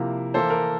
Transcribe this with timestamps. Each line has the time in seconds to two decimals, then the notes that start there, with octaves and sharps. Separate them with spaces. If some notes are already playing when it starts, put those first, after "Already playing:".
Already playing: C3 F3 A#3 E4
0.34 E3 A#3 E4 A4 C5
0.50 A#4